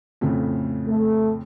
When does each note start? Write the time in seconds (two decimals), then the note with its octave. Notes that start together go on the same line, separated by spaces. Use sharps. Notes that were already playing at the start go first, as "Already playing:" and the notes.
0.21 F2 A2 C#3
0.88 A3